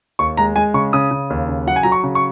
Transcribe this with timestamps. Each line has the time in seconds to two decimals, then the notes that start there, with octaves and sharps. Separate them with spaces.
0.19 D#2 C#6
0.37 G#3 A#5
0.56 G#3 G#5
0.74 C#3 C#6
0.93 C#3 D#6
1.11 C#3
1.30 D#2
1.49 C#3
1.67 F#3 F#5
1.76 G#5
1.83 F#3 A#5
1.92 C#6
2.04 C#3
2.15 C#6